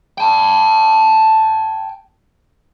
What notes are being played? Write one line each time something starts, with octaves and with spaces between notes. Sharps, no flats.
G5 A5